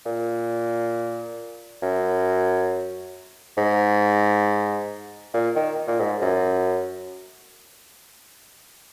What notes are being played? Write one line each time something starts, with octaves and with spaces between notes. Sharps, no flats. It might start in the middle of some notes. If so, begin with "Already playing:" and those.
A#2
F#2
G#2
A#2
D#3
A#2
G#2
F#2